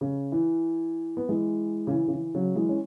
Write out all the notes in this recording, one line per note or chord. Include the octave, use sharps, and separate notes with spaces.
C#3
E3
B3
E3 G#3
C#3
E3
C#3
E3
C#3 F#3
E3 G#3
C#4